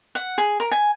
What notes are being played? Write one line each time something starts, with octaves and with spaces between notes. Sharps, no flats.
F#5
G#4
A#4
G#5